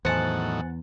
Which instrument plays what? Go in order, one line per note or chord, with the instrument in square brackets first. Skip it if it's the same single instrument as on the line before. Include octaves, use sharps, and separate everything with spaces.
[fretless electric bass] E2 [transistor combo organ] A2 D#3 F#3 [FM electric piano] C5 G#5 [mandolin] F#5 A5